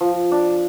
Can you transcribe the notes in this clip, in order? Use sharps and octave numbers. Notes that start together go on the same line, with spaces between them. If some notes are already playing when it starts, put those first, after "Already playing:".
F3
D4